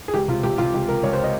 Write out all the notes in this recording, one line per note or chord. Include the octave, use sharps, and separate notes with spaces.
G#4
C#2 G4
C3 F4
C3 G4
C3 F4
C#2 G4
C#2 A#4
C#2 C#5
C5
D#5